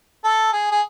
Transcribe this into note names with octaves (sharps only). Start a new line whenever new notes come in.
A4
G#4
G#4